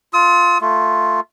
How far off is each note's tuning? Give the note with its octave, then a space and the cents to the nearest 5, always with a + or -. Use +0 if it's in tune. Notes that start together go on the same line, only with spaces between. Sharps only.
F4 +0 D#6 +45
A3 +5 F4 +0